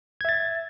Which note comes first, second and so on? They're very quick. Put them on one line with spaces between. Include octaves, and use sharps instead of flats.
G#6 E5 A6